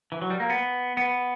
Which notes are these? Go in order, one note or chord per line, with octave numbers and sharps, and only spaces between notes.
E3
F#3
G3
A#3
B3
B3